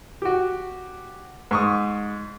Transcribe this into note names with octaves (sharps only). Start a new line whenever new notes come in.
F#4 G4
G#2 C#6 D#6